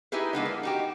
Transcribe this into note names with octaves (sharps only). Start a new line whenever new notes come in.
D#4 E4 G4 G#4 B4
G#3 A#3 B3 D4
A#3
D#4 F#4 G4